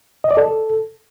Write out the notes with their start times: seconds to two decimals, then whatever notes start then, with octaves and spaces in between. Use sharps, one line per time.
0.24 D#5
0.31 D5
0.37 A4